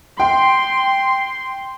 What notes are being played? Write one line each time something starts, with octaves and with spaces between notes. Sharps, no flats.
G5 C6